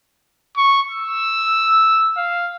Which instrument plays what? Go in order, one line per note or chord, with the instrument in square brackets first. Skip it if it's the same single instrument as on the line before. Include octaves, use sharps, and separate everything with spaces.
[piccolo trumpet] C#6
E6
F5